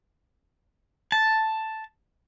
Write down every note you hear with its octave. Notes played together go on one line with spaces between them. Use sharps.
A5